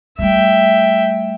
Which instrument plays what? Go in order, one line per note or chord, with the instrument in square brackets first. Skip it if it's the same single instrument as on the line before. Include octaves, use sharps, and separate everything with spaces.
[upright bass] G3 A3 [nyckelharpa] E5 G5